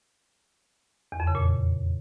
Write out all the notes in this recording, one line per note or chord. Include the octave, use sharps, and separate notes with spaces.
E2
F2
C#3
A#2